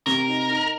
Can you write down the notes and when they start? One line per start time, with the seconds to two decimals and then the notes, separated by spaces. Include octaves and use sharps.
0.06 C3 A#4
0.28 D#4
0.50 D#4